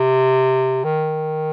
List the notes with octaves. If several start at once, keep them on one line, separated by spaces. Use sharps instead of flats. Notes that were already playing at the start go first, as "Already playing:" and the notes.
Already playing: C3
D#3